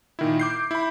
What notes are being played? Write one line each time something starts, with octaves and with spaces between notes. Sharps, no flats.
A#2 D#3 E4
D6 G6 C7
E4 B5